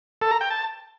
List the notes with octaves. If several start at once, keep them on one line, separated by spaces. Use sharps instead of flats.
A4
A#5
G5
A5